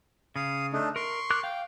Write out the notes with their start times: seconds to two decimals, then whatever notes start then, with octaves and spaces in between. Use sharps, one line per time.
0.36 C#3 F5 D#6
0.73 A3 D4 D#4
0.96 A#4 C6 C#6
1.30 A#4 D6 F#6
1.43 F5 G5